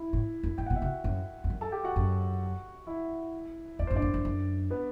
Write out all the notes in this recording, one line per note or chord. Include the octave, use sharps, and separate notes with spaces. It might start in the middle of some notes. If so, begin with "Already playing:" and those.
Already playing: E4
A2
F#2
A2 G5
F#5
B2
E5
C3
F#4 F#5
F#2
E2
F#2
A4 A5
G4 G5
F#4 F#5
F#2
E4 E5
E2 D5
F#2 C5
D4 D5
F#2
F#2
F#2
B3 B4